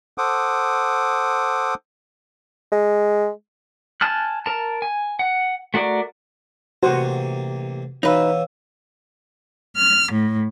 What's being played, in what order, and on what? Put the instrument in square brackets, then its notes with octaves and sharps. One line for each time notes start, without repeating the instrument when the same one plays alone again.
[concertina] A4 C5 F#5 D6 D#6
[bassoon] G#3
[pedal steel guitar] G#5 A5 F6 F#6
A#4 A5
G#5
F#5
A3 F#4 A#4 D5
[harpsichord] A1 C3 A#3 [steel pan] F#4 C5 F#5
[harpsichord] B2 E3 [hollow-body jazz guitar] D#4 B4 [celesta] C#5 F5 E6
[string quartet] F6
A2